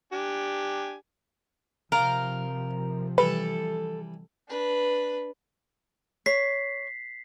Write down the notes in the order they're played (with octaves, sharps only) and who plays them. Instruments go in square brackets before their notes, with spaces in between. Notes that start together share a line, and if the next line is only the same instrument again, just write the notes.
[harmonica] D4 G4 G#5
[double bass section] C3 F3 [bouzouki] A#4 [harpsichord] D5 F5 G5
[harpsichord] E3 G3 G4 [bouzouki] A4 [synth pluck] B4
[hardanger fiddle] D4 B4
[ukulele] C#5 [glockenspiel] B6 C7